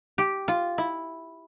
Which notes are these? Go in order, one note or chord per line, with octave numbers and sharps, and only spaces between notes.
G4
F4
E4